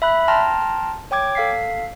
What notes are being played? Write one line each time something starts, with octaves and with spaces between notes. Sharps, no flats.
E5 B5 F#6
G5 A5 A#5 C6 F6 A#6
C#5 G5 D6 G#6
A4 F5 B6 C7